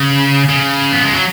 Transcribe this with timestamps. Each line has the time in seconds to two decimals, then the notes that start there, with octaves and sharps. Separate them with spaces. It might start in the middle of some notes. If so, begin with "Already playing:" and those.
Already playing: C#3
0.49 C#3
0.93 B3
1.03 G#3
1.13 F#3